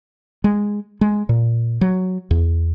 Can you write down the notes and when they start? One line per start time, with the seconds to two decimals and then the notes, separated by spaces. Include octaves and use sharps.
0.44 G#3
1.01 G#3
1.29 A#2
1.81 F#3
2.31 E2